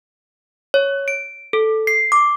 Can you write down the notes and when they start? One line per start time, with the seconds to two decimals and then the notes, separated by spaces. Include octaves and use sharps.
0.74 C#5
1.08 D7
1.53 A4
1.87 C7
2.12 D6